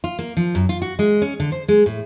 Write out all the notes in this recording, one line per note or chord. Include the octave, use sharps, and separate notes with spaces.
F4
A#3
F3
F#2
F4
F#4
G#3
C#4
D3
C5
G#3
A2